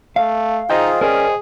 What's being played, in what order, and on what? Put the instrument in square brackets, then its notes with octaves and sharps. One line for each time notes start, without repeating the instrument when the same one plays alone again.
[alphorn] A3 [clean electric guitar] F5
[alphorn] D#4 [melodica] F4 G#4 [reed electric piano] C5 D#5 G5
[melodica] C#4 [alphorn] G#4 [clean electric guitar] A#4 D5